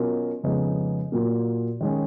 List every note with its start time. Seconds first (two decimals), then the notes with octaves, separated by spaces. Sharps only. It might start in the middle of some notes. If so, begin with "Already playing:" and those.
Already playing: B2 F#3 C#4 F4 A#4
0.44 F2 C#3 G#3 B3 D#4
1.12 A#2 F#3 A#3
1.81 D#3 G#3 C#4